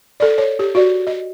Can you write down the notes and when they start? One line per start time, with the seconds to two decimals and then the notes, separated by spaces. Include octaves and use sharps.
0.20 A4 D5
0.38 C#5
0.59 G4
0.75 F#4 D5
1.07 D#5